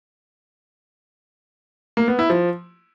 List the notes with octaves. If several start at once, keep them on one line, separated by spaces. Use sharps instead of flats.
A#3
B3
E4
F3